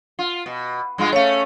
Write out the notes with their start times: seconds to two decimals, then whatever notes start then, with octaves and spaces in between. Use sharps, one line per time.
0.19 F4
0.46 B2
0.98 G2 G#3 F4
1.12 A3 C#4 C#5 F5